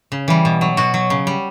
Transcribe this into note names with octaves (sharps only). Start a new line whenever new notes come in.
C#3
E3 G3
B2
F#3
B2 F#4
F#3
C#3
G3